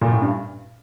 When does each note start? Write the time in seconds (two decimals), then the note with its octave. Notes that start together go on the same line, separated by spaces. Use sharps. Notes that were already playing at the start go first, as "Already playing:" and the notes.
0.01 A#2
0.11 A2
0.22 G2